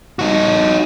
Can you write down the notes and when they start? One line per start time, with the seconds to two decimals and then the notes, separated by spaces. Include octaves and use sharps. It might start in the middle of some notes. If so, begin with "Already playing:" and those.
0.19 D#4 F#4